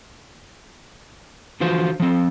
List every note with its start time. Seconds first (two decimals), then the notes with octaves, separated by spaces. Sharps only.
1.60 D3 E3 F3 F4 F#4 C5
2.00 F3 C4